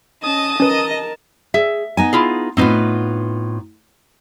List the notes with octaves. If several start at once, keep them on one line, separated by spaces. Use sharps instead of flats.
C#4 D#5 A5 D#6
C#4 A#4 B4 D#5 A5
G#4 E5
B3 D#4 G#5
E4 F4 G#4
A2 B3 C4 D#4 F4 B4